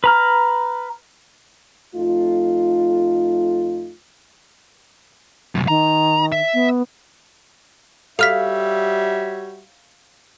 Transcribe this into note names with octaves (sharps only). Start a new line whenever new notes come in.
B4 A#5 F6
F2 A3 D#4 F4
C2 F#2
D#3 A#5
E5
B3
G3 F#4 A4 C#5 E5 F5 F6 B6